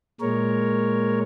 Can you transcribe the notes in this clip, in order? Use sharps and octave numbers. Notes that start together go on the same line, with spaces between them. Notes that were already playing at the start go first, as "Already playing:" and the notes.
A#2 G#3 A#4 C#5